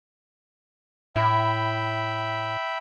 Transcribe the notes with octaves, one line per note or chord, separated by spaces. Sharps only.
A2 E4 E5 G5 B5